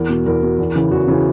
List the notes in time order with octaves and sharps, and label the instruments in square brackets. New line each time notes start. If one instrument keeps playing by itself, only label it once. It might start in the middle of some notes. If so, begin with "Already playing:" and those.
Already playing: [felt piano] E2 A#4
B2
E2 A#4
B2
E2
C#3 E3
E2 F#4
C#3 E3